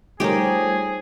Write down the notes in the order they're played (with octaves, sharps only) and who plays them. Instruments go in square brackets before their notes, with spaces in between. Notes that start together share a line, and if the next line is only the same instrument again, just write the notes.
[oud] F3 A#4 [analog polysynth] G3 A3 C#5 [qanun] D#4 G4 [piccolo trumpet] G#4